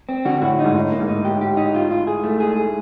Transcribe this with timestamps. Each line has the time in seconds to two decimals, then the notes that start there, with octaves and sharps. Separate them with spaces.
0.09 C4
0.25 D3 F#4
0.42 A2 F#4
0.59 D#4
0.65 G#2
0.75 A2 D#4
0.92 A#3
1.00 G#2
1.08 D#4
1.25 G4
1.41 G4
1.57 D#4
1.74 F4
1.91 F4
2.07 G#4
2.24 A3
2.40 G#4
2.56 G#4